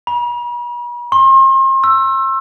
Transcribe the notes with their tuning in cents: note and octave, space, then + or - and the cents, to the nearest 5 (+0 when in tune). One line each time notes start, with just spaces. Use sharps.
B5 -45
C6 +40
E6 +15